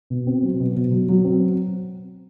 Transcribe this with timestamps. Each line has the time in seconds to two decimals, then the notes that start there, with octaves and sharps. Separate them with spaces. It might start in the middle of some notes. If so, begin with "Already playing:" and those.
0.10 B2
0.27 C4
0.43 F#3
0.60 B2
0.76 B2
0.91 F#3
1.09 F#3
1.24 C4